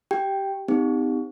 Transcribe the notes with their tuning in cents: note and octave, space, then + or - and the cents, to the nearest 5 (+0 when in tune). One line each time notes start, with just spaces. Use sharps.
G4 -15 G5 +0
C4 -40 D#4 +0 G4 +25